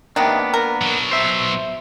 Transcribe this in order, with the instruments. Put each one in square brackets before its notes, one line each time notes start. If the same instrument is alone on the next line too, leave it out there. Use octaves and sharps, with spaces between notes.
[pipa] C3 D#3 [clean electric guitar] A#3 B3 D4
[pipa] A#4
[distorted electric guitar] B2 F#3
[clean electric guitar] C5 E5